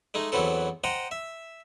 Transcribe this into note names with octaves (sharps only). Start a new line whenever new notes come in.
G#3 A3 D#4
E2 E3 F#3 B3 C4 A4
C5 D#5 F#5 G5 A#5
E5